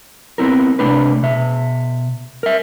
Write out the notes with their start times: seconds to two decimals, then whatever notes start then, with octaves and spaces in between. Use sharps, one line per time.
0.38 B3 C4 E4 A#4
0.79 C3 A3 D4 B4
1.23 B2 E5
2.43 A#4 E5